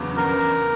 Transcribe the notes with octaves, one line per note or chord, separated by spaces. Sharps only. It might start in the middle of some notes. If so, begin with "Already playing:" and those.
Already playing: E2 C#3 F#3 B3 D4
E2 A#4